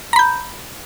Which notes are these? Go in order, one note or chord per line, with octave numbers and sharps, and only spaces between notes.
A#5 B5 G6